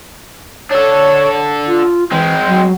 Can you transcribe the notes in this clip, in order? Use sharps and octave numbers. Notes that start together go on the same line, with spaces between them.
D4 A4 C#5
F4
E3 G#3 C4
F#3